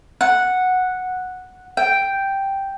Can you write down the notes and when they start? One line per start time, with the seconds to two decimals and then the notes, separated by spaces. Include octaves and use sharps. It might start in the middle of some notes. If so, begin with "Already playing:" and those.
0.21 F#5
1.77 G5